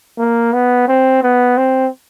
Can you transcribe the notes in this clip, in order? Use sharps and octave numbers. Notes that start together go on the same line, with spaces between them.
A#3
B3
C4
B3
C4